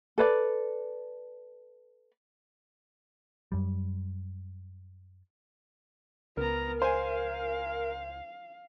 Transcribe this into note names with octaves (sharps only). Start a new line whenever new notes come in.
A4 B4 D5
F#2 G3
C#2 B3 A#4 A#5
C5 F5 G#5